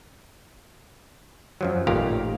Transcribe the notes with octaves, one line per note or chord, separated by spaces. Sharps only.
F#2 F3 F#3
A1 A#2 D#3 G4 F5 A#5